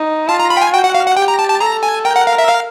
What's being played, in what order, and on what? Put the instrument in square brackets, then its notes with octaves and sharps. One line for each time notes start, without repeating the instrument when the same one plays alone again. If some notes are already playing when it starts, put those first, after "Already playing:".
Already playing: [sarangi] D#4
[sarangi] F4 [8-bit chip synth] A5
[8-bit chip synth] A#5
B5
G5
G#5
[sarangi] F#4 [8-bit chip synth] G5
[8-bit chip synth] F#5
F5
F#5
[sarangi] G4 [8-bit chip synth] G5
[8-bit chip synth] A#5
A5
A5
[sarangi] A4 [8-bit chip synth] A#5
[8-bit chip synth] G#5
[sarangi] A#4 [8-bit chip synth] G5
[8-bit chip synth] F#5
F5
E5
F5